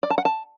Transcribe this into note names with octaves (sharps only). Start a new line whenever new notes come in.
D5
A5
F#5
A5